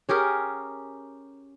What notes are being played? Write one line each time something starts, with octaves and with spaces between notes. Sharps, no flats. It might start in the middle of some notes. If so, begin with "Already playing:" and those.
C#4 G4 G#4 A#4